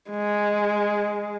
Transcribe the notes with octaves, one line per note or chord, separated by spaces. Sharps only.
G#3